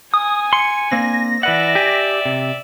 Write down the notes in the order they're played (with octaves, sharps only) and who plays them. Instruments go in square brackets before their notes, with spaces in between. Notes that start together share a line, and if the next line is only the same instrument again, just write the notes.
[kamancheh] G#5 [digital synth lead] D#6
[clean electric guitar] C6 [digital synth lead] C#7
[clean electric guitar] A#3 C4 D4 [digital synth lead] A#6
[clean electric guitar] E3 B4 F#5 [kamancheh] D5 E5
[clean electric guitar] G4 G#5
C3